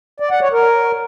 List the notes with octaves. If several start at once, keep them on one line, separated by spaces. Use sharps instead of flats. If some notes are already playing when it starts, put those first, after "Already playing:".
D5
F#5
C#5
A#4